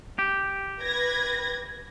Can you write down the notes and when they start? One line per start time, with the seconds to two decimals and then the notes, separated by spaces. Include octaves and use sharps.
0.19 G4
0.82 B4 G#6 A#6